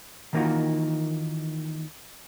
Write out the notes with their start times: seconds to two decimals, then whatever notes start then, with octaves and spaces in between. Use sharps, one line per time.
0.33 D#3 E3 A#3 D#4 F4 F#4